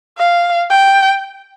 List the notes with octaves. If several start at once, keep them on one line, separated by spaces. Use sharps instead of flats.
F5
G5